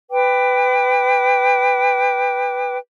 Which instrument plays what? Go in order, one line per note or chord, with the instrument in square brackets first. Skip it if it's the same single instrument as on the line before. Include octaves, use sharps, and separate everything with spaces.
[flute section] B4 G5 D6